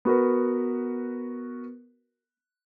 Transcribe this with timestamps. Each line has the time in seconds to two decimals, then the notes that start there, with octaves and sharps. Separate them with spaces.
0.05 B3 F#4 A#4 B4